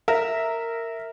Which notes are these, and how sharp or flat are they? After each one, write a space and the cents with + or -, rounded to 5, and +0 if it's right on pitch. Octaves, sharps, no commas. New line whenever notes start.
A#4 -15 E5 -10